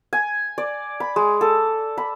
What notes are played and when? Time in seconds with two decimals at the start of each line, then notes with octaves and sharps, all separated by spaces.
0.13 G#5
0.58 D5
1.00 B5
1.16 G#3
1.41 A4
1.98 B5